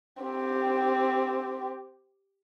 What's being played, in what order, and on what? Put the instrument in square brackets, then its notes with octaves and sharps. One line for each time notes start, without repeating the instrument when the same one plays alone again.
[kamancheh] C4 G4